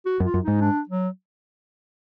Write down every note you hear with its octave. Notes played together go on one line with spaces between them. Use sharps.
F#4
F#2
F4
F#2
G#2 D#4
D4
F#3